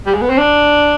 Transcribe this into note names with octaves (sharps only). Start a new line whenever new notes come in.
G3
G#3
B3
C4
D4